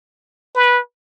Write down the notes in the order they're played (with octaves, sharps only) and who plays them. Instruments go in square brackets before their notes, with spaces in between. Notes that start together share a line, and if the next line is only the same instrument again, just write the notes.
[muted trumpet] B4